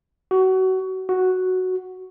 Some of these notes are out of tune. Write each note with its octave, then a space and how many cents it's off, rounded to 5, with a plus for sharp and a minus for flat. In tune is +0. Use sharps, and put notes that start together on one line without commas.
F#4 +25
F#4 +0